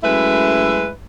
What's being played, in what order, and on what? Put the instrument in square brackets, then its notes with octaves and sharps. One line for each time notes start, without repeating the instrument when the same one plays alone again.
[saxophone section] F#2 G#3 A3 E4 B4 E5